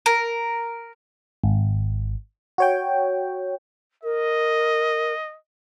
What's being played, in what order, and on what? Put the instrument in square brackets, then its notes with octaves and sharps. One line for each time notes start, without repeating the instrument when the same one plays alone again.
[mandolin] A#4
[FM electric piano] G#1
F#4 C#5 G5
[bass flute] A#4 [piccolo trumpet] D#5